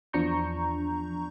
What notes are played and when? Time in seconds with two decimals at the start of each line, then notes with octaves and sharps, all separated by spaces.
0.13 E2 F3 D4 A#5 C#6 G6